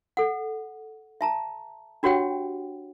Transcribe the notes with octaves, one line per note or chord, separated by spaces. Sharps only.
A4 F#5
E5 A5 A#5
D4 F#4 G4 C#5 F#5 G5